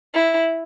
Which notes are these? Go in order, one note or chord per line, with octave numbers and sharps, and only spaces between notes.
E4